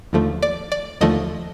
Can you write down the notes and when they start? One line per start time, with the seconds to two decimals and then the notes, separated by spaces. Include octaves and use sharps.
0.13 D#2 D3 F3 A3
0.43 D5
0.72 D5
1.01 D#2 D3 F3 A3 D#5